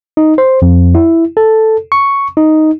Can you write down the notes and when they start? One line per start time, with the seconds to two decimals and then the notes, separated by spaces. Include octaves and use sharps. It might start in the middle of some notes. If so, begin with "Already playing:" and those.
0.17 D#4
0.38 C5
0.62 F2
0.95 E4
1.37 A4
1.92 C#6
2.37 D#4